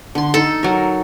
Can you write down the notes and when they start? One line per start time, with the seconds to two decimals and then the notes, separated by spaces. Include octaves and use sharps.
0.15 D3 C6
0.34 D#4 A4
0.63 F#3 A#4